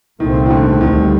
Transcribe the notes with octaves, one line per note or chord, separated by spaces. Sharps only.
C2 A#2 D#3 A3 C4
D#3
D3
D2 D3 D#3 G3